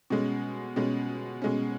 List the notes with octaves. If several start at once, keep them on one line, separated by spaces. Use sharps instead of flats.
B2 G#3 C#4
B2 G#3 C#4
B2 G#3 C#4